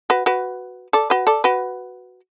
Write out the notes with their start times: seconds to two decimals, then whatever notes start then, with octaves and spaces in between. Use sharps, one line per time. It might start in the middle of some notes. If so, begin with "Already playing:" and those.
0.10 F#4 B4
0.26 F#4 B4
0.93 A4 D5
1.10 F#4 B4
1.27 A4 D5
1.44 F#4 B4